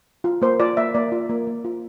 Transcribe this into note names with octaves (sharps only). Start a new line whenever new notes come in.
F4
A#3 C5
F4 D5
A#3 E5
A#3 D5
F4
A#3
A#3
F4